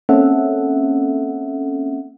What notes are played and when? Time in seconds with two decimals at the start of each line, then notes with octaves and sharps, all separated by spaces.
0.09 A#3 C4 C#4 A4 E5 F#5